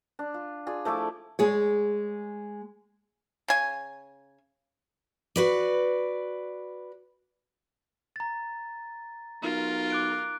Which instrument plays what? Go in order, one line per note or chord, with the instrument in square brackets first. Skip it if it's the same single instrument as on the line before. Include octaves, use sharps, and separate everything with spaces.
[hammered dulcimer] D4
F4
F4 G#4 D5
F3 A3 E4 D6
[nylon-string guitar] G#3 G#4 C#5
[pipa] C#3 G#5
[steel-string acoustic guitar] F#4 B4 D5
[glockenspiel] A#5 A6
[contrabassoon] B1 [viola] F4 A#4
[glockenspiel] D6 F#6 D7